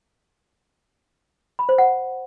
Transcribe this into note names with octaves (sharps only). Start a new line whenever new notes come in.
B5
C5
F#5